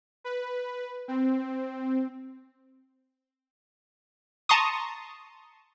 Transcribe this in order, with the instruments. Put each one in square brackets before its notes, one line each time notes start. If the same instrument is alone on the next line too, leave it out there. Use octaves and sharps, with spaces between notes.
[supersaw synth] B4
C4
[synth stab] A5 A#5 C6 C#6 D#6